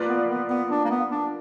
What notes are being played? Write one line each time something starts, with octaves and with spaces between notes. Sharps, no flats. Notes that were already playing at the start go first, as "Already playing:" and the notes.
Already playing: A#3 F4 B4 D5
B3
B3
B3
D4
A#3
B3
D4